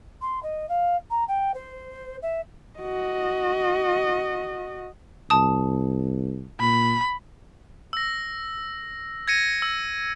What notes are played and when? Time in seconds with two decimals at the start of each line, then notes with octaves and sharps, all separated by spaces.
0.21 C6
0.43 D#5
0.69 F5
1.10 A#5
1.28 G5
1.54 C5
2.22 E5
2.79 F#4 D#5
5.30 C2 A5 D#6
6.60 A#2 B5
7.93 E6 A#6
9.28 G#6 A#6 C#7 D#7
9.62 E6